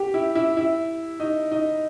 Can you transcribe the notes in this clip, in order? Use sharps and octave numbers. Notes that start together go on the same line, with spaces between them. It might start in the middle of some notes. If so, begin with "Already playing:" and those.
Already playing: G4
E4
E4
E4
D#4
D#4